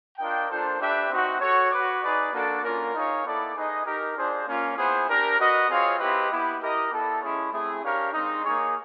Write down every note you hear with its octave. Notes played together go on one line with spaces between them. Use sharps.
D4 F4 A#4 D#5 G5
A#3 D4 F4 A4 C5
D4 G4 B4 E5 G5
C4 D#4 F#4
F#4 A4 C#5
F#4 B4 D5
D#4 G#4 B4 D5
A#3 D4 F#4 A4 D5
A#3 C#4 F4 A#4
D#4 G#4 C#5 F5
B3 E4 A4 D5
D#4 G#4 B4 D#5
D#4 G4 A#4
D4 F4 G#4 C5
A#3 C#4 F4
B3 E4 G#4 C5
D4 G4 A#4
F#4 B4 D#5
C4 F4 G#4 C#5 F5
C4 E4 G4 B4 D#5
B3 E4 G4
E4 G4 A#4 D#5
B3 E4 A4 D5
G#3 C#4 E4 G#4 C#5
A3 C4 E4 G#4
D4 G4 A#4 C#5 F5
G#3 C4 D#4
A#3 D#4 G#4 C#5